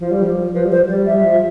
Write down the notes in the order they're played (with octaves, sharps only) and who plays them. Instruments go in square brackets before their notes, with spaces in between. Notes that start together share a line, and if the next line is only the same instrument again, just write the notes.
[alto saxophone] F3 [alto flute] F4
[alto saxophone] G3
[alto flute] G4
[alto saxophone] F3
[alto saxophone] F3 [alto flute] B4
[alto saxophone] G3
[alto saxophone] F3 [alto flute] C5
[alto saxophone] F3
[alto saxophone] G3 [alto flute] D5
[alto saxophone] G3 [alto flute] E5
[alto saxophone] F3